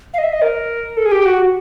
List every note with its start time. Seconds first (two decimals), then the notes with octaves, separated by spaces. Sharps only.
0.14 F5
0.18 D#5
0.23 E5
0.33 D#5
0.42 A#4
0.97 A4
1.06 G#4
1.12 G4
1.26 F#4